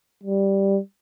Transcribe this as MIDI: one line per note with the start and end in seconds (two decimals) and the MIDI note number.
0.23 0.79 55